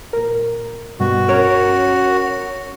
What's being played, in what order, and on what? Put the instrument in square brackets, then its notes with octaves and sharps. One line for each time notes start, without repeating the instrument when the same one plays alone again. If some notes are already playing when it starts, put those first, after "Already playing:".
[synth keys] A#2 A#4
[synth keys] G2 B2 G3 [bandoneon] F#4
[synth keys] C#4 [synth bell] A#4 C#5